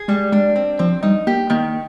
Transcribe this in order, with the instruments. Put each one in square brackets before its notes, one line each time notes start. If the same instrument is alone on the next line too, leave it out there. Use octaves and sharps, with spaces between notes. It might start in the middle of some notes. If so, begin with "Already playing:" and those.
Already playing: [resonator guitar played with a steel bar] G#4
[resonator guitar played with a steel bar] G3 [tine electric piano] G#3
[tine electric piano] G#3 [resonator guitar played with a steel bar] D4
[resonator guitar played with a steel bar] C4
[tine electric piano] F3 [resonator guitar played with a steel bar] C4
[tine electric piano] G3 [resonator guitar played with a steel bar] D#4
[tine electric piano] A#3 [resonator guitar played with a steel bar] G4
[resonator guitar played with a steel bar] D#3 [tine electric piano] A#3